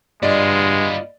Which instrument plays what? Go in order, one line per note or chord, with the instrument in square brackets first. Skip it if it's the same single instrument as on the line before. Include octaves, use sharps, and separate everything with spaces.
[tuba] G2 [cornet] G#3 [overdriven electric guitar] B3 F4 [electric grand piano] D5 D#5